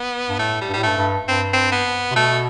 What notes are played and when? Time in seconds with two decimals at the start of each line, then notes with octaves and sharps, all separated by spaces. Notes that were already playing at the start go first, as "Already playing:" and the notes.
Already playing: B3
0.29 G2
0.39 A2 A3
0.61 G3
0.69 G2
0.74 A2 G3
0.83 G2 A3
0.98 G2
1.27 G2 C4
1.54 C4
1.72 B3
2.11 C3
2.16 B2 A3